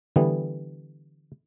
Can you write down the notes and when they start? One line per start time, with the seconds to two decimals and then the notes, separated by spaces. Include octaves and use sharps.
0.16 D3 E3 G3 B3